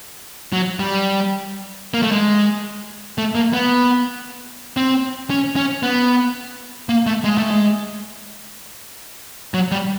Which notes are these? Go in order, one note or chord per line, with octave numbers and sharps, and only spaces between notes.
F#3
G3
A#3
A3
G#3
A3
A#3
B3
C4
C#4
C#4
B3
A#3
A3
G#3
A3
G#3
F#3
G3